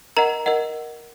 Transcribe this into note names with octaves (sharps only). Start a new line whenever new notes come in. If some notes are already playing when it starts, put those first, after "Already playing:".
A#4 D#5 F#5 A#5
A#4 D#5 F#5